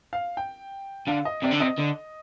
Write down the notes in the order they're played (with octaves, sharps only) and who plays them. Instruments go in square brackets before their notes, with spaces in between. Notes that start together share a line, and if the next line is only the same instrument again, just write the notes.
[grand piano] F5
G5
[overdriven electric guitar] D3 [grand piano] F5
[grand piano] D#5
[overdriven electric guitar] C3 [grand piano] D5
[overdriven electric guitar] D3
[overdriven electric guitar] C3 [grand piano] D#5
[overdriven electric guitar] D3